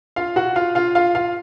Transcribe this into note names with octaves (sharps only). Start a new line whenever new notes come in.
F4 F5
F#4 F#5
F4 F5
F4 F5
F4 F5
F4 F5